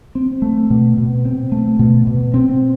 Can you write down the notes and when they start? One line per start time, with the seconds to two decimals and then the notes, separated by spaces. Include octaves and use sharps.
0.15 C4
0.42 A3
0.70 B2
0.98 B2
1.25 C4
1.52 A3
1.79 B2
2.07 B2
2.34 C4